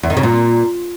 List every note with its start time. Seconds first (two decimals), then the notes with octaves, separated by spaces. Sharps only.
0.03 E2
0.10 D#3
0.17 C#3
0.23 A#2